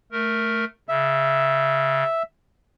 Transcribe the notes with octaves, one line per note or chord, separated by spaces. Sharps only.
A3 A#4
C#3 E5